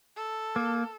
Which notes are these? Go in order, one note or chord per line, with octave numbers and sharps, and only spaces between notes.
A4
A#3